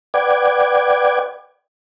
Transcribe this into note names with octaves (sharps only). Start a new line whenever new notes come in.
B4 D5 F#5 G5 D6 G#6